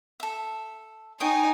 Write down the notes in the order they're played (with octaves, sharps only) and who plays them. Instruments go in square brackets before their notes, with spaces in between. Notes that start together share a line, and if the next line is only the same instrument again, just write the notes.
[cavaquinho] A4 E5
[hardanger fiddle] D#4 G#5 [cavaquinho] C#5 G5 D#6